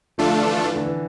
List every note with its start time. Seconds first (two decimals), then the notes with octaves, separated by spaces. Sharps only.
0.18 D3 F3 A3 D4 F4 A4
0.42 E3
0.64 E3
0.76 D3
0.86 E3